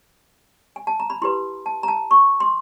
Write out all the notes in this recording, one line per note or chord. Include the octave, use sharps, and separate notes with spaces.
G#5
A5
A#5
B5
E4 G4 B4 C6
A5
A#5
A5
C#6
C6